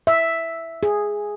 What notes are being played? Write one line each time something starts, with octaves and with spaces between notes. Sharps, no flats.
E5
G#4